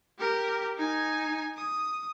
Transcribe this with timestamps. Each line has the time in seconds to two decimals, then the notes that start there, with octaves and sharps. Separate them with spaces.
0.19 G4 A#4
0.77 D#4 G#5
1.57 D#6